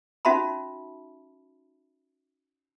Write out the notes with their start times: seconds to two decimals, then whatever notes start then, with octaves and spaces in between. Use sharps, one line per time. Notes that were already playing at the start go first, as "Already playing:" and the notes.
0.25 C#4 D#4 F#4 E5 A5 B5